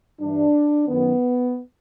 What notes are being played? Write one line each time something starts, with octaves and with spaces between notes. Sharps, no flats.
G2 E3 D4
F#2 D#3 B3